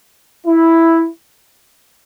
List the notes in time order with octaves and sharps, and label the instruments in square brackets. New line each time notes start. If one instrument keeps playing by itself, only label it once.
[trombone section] E4